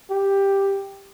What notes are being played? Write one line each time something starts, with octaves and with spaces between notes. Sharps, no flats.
G4